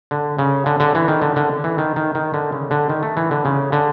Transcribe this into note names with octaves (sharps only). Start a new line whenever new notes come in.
D3
C#3
D3
D3
E3
D#3
D3
D3
E3
D#3
D#3
D#3
D3
C#3
D3
D#3
A3
E3
D3
C#3
D3